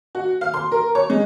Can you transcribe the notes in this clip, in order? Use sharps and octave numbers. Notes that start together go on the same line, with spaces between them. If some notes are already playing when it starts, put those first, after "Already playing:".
F#4
F5
C6
A#4
C#5
G#3